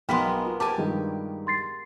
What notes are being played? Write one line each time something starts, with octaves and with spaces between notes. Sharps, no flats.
B1 G#3 A#3 B3 G5 B5 C6 B6
F4
G4 G#5 A5 D6
G2 D#3 G#3
C6 A6 C7